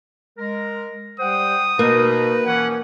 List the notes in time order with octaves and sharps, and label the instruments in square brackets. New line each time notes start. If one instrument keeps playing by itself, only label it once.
[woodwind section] G#3 A#4
[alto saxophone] G3 [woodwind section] C5 F#5 G5 [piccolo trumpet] D#6
[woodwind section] B2 D#4 [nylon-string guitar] A#3 [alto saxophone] B4
[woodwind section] E3 F3 C#4 [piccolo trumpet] F#5